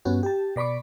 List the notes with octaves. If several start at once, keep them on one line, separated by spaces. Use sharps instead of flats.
G2 B3 C#4 F#4
G4 A5
B2 D5 B5 C#6 D6